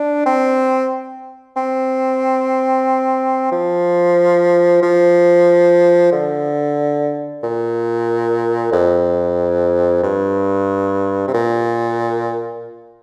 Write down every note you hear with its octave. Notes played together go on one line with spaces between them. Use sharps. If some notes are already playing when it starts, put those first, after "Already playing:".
Already playing: D4
C4
C4
F3
F3
D3
A#2
F2
G2
C3
A#2